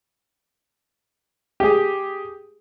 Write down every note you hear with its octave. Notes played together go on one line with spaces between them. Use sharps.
G4 G#4